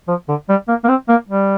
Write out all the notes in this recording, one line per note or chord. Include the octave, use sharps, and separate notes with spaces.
F3
D3
G3
A#3
A#3
C4
A#3
G3